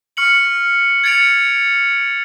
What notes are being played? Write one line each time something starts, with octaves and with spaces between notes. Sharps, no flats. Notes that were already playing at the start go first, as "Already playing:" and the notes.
C#6 F6 C#7 F#7
G#6 A6 C#7 D7 F7